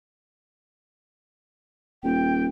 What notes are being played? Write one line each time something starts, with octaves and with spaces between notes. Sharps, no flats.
D#1 G5